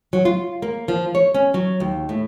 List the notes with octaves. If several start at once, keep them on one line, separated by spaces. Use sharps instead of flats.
F#3
F4
A#3
F3
C#5
C#4
F#3
D#2
A2